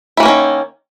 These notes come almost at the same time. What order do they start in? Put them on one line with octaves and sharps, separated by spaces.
E4 E3 A#3 C#4 D#3